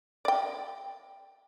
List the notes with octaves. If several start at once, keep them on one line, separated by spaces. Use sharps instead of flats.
D5 G5